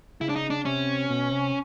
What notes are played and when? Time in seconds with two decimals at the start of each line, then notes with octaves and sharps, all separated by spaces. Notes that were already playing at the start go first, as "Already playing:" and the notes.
0.21 C#3 E4
0.29 D4
0.36 D#4
0.50 D4
0.65 C3 C#4
1.10 B2
1.31 C3